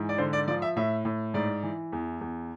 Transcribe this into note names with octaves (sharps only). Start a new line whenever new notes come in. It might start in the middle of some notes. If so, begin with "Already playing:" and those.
Already playing: G#2 E3
D5
D3 C5
D5
F3 D5
E5
A2 E5
A2
G#2 D5
E3
E2
E2